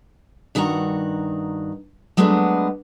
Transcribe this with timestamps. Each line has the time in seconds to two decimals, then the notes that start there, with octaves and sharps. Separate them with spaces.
0.55 G2 D#3 F#4 F#5 A5 A#5
2.17 F#3 G#3 A3 B3 D4 F#4